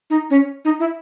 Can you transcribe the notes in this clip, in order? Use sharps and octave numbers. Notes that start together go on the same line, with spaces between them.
D#4
C#4
D#4
E4